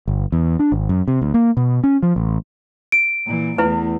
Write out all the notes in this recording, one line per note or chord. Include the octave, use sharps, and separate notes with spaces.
G1
E2
D4
G#1
F#2
C3
D2
A#3
B2
C#4
F3
A1
D7
A#2 E3
E2 A3 E4 B4